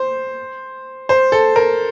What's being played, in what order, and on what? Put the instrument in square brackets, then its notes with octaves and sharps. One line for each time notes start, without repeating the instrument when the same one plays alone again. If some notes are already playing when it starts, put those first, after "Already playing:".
Already playing: [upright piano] C5
C5
A4
A#4